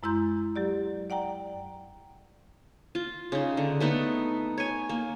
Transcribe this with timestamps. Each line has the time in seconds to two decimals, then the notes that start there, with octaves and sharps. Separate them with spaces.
0.03 F#2 G#3 E4 A#5 C6 G6
0.56 F#3 G4 D5
1.10 D5 F#5 G5 A#5
2.95 F4
3.32 C#3 D#4
3.57 D3
3.80 A3 B3 D#4 A4
4.58 C#5 G#5
4.89 A#3